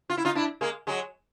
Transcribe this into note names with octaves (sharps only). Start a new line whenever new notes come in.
F4
E4
D#4 F4
D4 E4
G#3 A#3
F#3 G#3